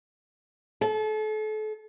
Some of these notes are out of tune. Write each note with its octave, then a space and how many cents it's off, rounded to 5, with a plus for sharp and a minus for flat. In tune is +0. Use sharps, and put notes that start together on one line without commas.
A4 -35